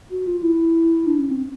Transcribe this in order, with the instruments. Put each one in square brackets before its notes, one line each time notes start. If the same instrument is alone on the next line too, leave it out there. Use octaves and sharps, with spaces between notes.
[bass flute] F#4
F4
E4
D4
C#4
C4